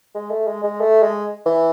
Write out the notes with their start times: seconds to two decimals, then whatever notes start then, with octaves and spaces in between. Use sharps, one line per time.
0.15 G#3
0.31 A3
0.47 G#3
0.64 G#3
0.81 A3
1.03 G#3
1.46 E3